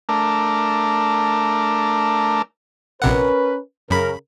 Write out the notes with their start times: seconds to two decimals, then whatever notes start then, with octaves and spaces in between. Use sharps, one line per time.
0.09 A3 D4 A#4
3.02 A#1 C3 C#4 A#4 B4 F#5
3.90 F#2 C#3 A#4 B5